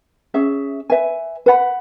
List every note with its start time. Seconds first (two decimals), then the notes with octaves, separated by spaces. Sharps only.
0.34 C#4 G#4 E5
0.90 B4 E5 G#5
1.46 B4 F#5 B5